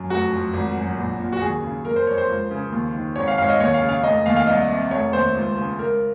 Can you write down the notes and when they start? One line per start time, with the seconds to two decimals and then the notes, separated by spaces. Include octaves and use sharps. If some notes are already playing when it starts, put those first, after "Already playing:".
Already playing: F#2
0.10 F1 F#4
0.32 F2
0.53 G#1
0.76 F#2
0.97 A#1
1.20 A#2
1.32 F#4
1.41 D#2 G#4
1.63 C#3
1.85 F#1 A#4
1.96 C5
2.06 F2 C#5
2.18 C5
2.28 C#2
2.51 C#3
2.72 D#2
2.94 D#3
3.16 G#1 C#5
3.28 F5
3.38 G#2 F5
3.44 C#5
3.49 D#5
3.60 D#2 C#5
3.74 F5
3.82 C#3
3.89 F5
4.03 F1 D#5
4.26 D#2 F5
4.36 F5
4.47 C2 D#5
4.69 C3
4.91 F1 C#5
5.13 D#2 C5
5.35 C#2
5.56 C#3
5.79 C#2 A#4